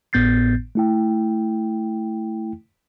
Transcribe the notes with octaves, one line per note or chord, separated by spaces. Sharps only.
G#1 A2 B3 G6 A6 C7
A3 E4 G5